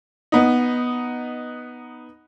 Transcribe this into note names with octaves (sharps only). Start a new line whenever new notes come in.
B3 D#4